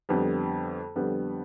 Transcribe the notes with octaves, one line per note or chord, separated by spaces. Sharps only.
F2 D3 G3 B3
F2 D3 G3 B3